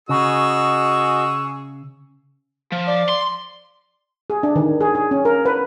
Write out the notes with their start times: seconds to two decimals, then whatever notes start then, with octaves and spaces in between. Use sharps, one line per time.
0.09 C#3 F#4 G#4 D#5 C#6 E6
2.72 F3
2.87 D5
3.09 C6
4.30 G#4
4.43 D4
4.56 D#3
4.81 G#4
4.95 G#4
5.11 C#4
5.25 A#4
5.45 B4